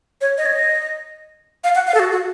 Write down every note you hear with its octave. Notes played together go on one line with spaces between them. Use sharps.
C#5
D#5
C#5
D#5
F5
F#5
F5
A4
F#4
F#4